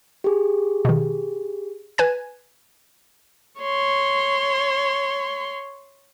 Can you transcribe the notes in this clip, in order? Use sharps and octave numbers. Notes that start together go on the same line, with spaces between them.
G4 G#4
B2 D#3
B4 G#5 G#6
C#5 C6